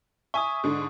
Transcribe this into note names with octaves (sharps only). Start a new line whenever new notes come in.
E5 G#5 C#6 D#6
G#2 D3